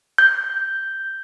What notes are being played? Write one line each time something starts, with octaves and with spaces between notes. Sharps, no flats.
G6